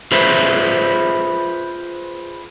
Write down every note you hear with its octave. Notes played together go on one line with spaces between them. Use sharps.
F4 G#4 B4 C5 E5